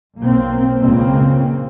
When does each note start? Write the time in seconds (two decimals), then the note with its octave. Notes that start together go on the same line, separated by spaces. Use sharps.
0.19 B1 A#3 C4
0.81 F#1 C#2 A#2 C#3 A#3 C4